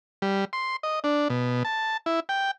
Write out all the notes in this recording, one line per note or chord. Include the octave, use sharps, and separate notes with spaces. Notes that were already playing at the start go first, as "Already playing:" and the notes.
G3
C6
D#5
D4
B2
A5
E4
G5